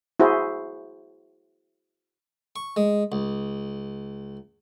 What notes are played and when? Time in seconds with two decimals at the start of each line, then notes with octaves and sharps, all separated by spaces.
0.20 E4 F#4 G#4 C5
2.56 C#6
2.76 G#3
3.12 C#2